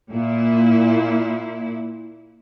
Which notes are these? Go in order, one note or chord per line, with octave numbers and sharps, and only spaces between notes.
A#2 E4